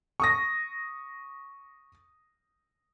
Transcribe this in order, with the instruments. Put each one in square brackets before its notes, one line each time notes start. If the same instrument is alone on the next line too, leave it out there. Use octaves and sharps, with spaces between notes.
[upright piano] C#6 D#6 A#6